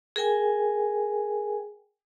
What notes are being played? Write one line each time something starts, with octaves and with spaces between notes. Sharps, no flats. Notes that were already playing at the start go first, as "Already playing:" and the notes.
G#4 A#4 G5 G#5